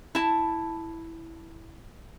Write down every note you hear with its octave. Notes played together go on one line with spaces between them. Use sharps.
E4 A5